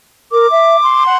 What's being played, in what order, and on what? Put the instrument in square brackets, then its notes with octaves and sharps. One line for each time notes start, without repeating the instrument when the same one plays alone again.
[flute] A#4 [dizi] D6
[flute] E5
C6
[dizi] F#5